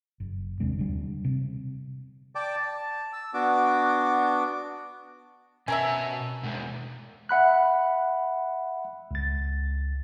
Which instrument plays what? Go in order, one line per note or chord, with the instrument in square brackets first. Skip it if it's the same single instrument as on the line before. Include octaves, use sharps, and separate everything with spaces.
[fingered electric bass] F#1
D#2 C3 G#3 D4
D3 G3
C3
[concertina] D5 G5 A5 D6
A5
E6
B3 D4 F#4 D6
[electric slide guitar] B2 A5 [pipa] C#4 A#4 E5
[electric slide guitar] B2 G#3
[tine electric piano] E5 F#5 B5 F#6
C#2 A6